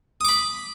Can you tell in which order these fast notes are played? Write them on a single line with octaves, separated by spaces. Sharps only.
D#6 D6 B5